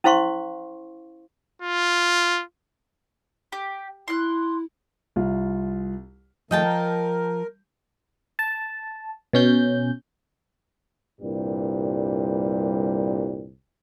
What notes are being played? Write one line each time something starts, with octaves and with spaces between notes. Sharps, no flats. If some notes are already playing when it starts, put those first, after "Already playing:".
C#4 E4 C5 F5 C6 C#6
F4
G4
E4 C6 F#6
C2 F4
D#3 F3 A3 D#5 G5 A5
A#4
A5
B2 C#4 G6
C2 G2 A#2 G3